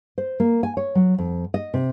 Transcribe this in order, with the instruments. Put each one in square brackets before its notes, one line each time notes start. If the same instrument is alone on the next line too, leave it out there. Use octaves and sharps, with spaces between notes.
[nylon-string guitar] C5
A#3
G#5
C#5
F#3
F2
D#5
C3